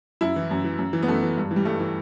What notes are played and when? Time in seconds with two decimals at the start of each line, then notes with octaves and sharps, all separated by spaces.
0.21 F#2 E4
0.36 E3
0.51 F#2
0.64 E3
0.79 F#2
0.93 E3
1.02 B3
1.08 F#2 A3
1.23 E3
1.38 G2
1.51 E3
1.56 G3
1.65 G2 A3
1.80 E3